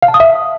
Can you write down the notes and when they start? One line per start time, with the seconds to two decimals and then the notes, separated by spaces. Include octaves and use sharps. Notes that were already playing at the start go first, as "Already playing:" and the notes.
0.02 F5
0.08 A5
0.14 D#6
0.20 E5